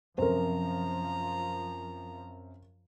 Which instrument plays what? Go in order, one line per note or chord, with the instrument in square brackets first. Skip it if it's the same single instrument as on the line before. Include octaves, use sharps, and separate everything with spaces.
[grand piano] F#2 C3 [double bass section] F3 [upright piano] A#4 C5 [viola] A#5